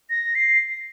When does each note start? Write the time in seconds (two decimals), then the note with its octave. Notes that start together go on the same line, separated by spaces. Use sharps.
0.10 A#6
0.35 C7